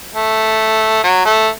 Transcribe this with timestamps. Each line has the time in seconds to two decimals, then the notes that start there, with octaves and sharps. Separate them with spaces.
0.15 A3
1.04 F#3
1.25 A3